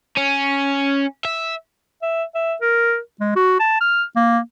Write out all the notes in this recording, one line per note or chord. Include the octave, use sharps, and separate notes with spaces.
C#4
E5
E5
E5
A#4
G#3
F#4
A5
F6
A#3